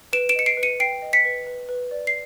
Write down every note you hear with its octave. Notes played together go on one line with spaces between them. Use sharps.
B4 D7 E7
D7 E7
D#5 C#7
C7 D7
B4
C#7 D#7
G5 C7 D7
D#5
B6 C#7
B4
B4
B4
D5
C7